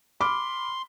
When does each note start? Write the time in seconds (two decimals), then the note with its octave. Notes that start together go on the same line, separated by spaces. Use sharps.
0.21 B5 C6 D6 F6